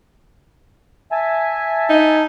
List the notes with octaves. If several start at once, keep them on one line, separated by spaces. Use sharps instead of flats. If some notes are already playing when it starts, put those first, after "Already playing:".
E5 G#5 A5
D#4